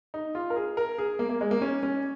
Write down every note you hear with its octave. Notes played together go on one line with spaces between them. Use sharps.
D#4
F4
A#4
G#4
A#4
G#4
A#3
A#3
G#3
A#3
C#4
C#4